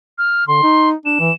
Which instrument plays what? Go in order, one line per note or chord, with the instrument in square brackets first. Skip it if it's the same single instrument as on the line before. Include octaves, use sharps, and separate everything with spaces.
[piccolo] F6
[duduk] D3 [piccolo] C6
[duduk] D#4
[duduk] D4 [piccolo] E7
[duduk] E3